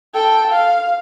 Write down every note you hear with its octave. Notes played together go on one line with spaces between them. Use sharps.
A4 G5
F5